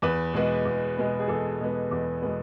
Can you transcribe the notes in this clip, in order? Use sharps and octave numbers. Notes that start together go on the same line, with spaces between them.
E2 B4
B2 G#3 B3
E2
B2 G#3 B3
G#4
E2 A4
B2 G#3 B3
E2
B2 G#3 B3